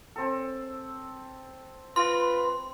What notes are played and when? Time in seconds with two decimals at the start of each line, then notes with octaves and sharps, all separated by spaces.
0.16 C4 A4
1.96 F4 B4 C6